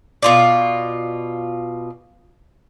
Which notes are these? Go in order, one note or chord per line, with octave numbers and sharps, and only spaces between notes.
B2 F4 D5